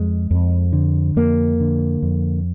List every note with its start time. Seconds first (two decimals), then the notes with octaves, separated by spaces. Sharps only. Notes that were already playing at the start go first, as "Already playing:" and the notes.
Already playing: F2 G#3
0.31 F2
0.73 D3
1.16 F2 A#3
1.60 D3
2.03 F2